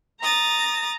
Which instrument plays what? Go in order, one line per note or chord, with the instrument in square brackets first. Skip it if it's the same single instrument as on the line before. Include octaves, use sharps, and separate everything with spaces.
[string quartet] A#5 D#6 A6